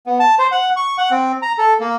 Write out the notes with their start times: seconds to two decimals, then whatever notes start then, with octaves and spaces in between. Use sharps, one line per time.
0.07 B3
0.20 A5
0.39 C5
0.52 F#5
0.76 C#6
0.98 F#5
1.11 C4
1.42 A#5
1.58 A4
1.80 A#3